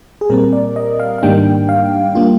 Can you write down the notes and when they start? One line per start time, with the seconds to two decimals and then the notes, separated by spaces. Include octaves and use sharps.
0.21 G#4
0.30 A#2 G3 C4 A#4
0.53 D5
0.76 D#5
0.99 F5
1.18 F5
1.23 G#2 D#3 G3 A#3 D4 G5
1.69 F5
2.15 G3 A#3 F4